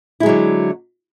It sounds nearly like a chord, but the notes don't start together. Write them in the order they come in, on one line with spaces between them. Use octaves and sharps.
E4 G#3 F#3 D3